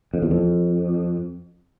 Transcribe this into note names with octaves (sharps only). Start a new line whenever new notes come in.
F2
E2
F2